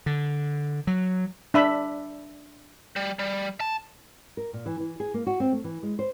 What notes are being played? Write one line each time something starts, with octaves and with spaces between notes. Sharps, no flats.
D3
F#3
D4 E5 B5
G3
G3
A5
A#4
A#2
E3
E3
G#4
A#3
F#4
C4
A3
E3
G#3
C5